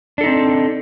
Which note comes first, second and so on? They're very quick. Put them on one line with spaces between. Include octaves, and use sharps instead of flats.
D4 A4 D#4 C4